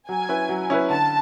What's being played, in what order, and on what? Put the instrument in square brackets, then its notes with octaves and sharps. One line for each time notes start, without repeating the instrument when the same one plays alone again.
[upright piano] F#3 [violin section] G#5
[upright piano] C#4 E4 B4
F#3
C#4 E4 B4
[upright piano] D3 [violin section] A5